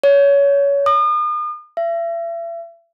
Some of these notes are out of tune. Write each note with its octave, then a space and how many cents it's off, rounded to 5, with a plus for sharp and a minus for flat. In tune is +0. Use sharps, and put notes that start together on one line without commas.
C#5 +25
D#6 -40
E5 +35